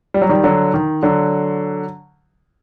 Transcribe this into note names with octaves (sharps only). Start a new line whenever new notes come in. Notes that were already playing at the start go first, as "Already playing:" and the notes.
G3
F#3
D#3 G3
D3 F#3
D#3
D3 F#3